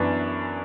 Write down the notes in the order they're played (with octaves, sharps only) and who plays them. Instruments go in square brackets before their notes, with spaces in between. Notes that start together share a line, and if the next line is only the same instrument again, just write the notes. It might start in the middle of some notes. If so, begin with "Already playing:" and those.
Already playing: [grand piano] F#2 E3 B3 D4